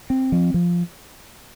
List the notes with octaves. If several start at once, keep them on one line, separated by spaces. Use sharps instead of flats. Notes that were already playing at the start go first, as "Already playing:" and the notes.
C4
F3
F3